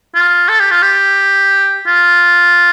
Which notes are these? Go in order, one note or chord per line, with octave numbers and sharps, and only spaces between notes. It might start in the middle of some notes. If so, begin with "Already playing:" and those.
F4
A4
G4
F4
G4
F4